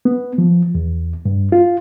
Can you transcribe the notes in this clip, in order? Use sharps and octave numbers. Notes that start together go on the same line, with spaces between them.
B3
F3
E2
G2
F4